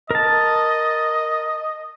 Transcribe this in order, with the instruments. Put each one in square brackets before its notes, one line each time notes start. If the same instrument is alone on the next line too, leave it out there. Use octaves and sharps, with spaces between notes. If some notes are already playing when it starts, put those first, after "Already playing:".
[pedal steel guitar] A#4 A5 [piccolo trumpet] D#5